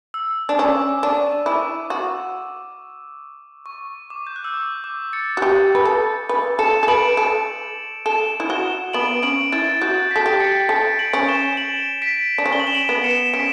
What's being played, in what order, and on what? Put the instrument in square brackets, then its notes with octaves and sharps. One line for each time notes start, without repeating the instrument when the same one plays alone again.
[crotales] E6
[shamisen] D4
[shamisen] C#4 [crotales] D6
[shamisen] D4 [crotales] C#6
[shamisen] E4 [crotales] D6
[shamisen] F#4
[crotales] C#6
D6
G6
F#6
E6
D6
D6
A6 C#7
[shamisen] F#4
G4
B4
A4
B4
[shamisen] A4 [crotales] C#7 E7
[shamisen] A4
[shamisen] B4 [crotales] D7 F#7
[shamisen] A4
[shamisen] A4 [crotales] E7 G7
[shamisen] E4
[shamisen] F#4 [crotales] E7 G7
[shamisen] B3 [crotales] D7 F#7
[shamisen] C#4 [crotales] D7 F#7
[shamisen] E4 [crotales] A6
[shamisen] F#4 [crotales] G6
[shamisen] A4 [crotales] B6
[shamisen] G4
[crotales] A6 C#7
[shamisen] A4 [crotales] B6 D7
[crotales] D7 F#7
[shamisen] C#4
[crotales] E7 G7
D7 F#7
B6 D7
[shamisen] D4
C#4
[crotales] G7
F#7
E7 G7
D7 F#7
[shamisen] B3
[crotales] C#7 E7
[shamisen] C#4 [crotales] B6 D7